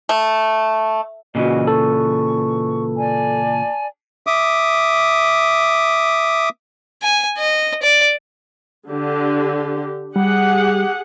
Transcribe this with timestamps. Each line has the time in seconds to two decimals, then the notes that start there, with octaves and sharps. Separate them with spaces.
0.09 A3
1.35 A#2 C#3 E3 F#4 D#5
1.67 A4 C#6
2.97 D5 G#5 A5
4.27 E5 D6 D#6
7.02 G#5
7.38 D#5
7.83 D5
8.87 D3 G4
10.16 G3 G4 G#4 F#5